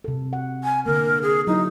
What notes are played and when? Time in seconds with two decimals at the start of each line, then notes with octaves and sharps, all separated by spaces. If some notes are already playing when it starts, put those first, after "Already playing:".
0.04 C3 A4
0.33 F#5
0.64 G#5
0.86 D3 A#3 A#4
1.22 G#4
1.47 F#3 D#4 E4